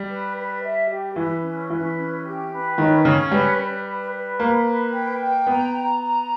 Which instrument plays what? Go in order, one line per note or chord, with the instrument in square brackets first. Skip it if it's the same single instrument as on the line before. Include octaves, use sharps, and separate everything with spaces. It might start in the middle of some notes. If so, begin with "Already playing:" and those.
Already playing: [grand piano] G3
[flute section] B4
B4
E5
G4
[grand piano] E3 [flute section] B4
[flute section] C#4
[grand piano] E3 [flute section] B4
[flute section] C#4
G4
B4
[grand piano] D#3 [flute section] C#4
[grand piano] C#3 [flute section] C#4
[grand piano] G3 [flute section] B4
[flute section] B4
B4
B4
[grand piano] A#3 [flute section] B5
[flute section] B4
G5
G5
[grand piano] B3 [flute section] A#5
[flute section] A#5
A#5